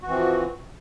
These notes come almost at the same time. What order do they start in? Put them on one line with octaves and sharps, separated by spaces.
F#4 E3 C4 F3